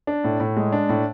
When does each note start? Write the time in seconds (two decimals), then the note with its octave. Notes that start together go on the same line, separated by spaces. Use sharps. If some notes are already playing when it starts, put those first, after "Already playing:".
0.07 D4
0.24 A2
0.40 A2
0.57 G#3
0.72 D4
0.89 A2